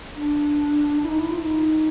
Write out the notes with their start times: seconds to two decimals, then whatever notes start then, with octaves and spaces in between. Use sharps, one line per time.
0.17 D4
1.03 E4
1.09 D#4
1.19 E4
1.30 F4
1.42 D#4